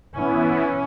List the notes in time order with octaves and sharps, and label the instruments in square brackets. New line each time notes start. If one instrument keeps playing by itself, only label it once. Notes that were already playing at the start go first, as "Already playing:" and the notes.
[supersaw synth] E3 B3 E4 [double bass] C#4